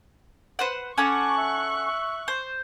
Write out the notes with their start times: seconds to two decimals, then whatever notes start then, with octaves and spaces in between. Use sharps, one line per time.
0.59 B4 C5 F#5
0.98 C#4 A4 F#5 C#6 D6 F#6
1.38 E5
2.28 C5